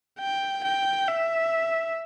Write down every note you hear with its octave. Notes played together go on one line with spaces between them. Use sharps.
G5
G5
E5